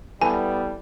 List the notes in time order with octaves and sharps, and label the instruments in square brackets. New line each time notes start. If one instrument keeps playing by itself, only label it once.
[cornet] G3 [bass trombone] B3 [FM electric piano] E4 A4 B4 [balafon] G#5